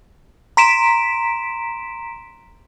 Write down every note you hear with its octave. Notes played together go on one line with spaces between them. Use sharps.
A#5 C6 B6 D7 E7